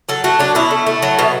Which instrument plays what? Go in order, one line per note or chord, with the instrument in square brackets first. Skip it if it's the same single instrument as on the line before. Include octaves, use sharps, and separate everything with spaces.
[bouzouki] F#3 A4
A3 F#4
F#3 D4
B2 E4
A3
A3
F#3
B2